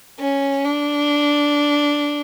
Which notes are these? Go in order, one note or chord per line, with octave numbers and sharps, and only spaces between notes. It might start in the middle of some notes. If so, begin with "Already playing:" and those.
C#4
D4